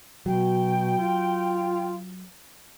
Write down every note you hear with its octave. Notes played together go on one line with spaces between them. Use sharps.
B2 F#3 G5
F4